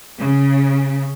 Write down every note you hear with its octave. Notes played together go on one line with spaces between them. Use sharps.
C#3